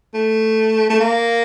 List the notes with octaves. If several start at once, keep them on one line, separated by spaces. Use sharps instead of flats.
A3
A3
A#3